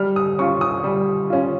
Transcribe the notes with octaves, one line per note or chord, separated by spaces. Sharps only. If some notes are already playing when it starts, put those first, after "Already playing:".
Already playing: G3 F6
D#6
C#4 F4 C#6
D#6
G3
C#4 F4